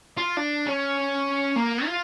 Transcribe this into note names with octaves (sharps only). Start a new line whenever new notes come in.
F4
D4
C#4
A#3
F4